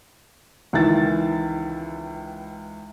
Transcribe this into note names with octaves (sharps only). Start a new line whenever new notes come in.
C#2 D#3 E3 E5 A6